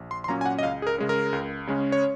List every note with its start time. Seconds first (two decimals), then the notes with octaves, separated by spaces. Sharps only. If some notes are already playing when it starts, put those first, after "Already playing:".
Already playing: A#1
0.11 C6
0.24 C6
0.28 A#2 F#3 A#3 C#4 A#5
0.41 G#5
0.46 F#5
0.59 D#5
0.63 C#2 F5
0.82 G#4
0.87 A#4
0.98 C#3 G#3 C#4
1.09 A#4
1.33 C#2
1.67 C#3 G#3 C#4
1.92 C#5